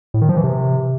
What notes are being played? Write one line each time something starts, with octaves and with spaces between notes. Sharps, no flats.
A2
D#3
F3
E3
C3